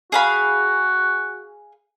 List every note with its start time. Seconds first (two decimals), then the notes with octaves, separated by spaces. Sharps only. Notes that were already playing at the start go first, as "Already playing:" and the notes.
0.12 F#4 G#4 F5 B5